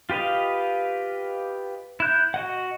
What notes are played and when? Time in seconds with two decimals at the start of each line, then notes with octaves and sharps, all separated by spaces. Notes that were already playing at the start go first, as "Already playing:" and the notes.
0.10 F4 G4 B4 D#5 F5
2.00 E4 F#6 G6
2.34 F#4 D#5 F#5